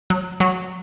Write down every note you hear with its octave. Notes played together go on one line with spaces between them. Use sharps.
F#3
F#3